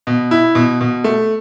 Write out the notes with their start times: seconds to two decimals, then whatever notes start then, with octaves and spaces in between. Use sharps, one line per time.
0.07 B2
0.31 E4
0.55 B2
0.81 B2
1.04 A3